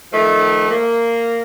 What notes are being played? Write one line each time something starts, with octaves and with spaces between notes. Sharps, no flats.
D#3 F3 A3
A#3